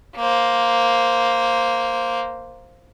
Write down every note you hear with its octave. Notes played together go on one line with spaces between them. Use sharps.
A#3 C5